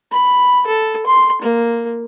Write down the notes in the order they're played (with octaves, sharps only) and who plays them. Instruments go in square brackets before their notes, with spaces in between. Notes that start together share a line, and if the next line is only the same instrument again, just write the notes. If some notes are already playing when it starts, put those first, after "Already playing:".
[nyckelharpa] B5
A4
C6
A#3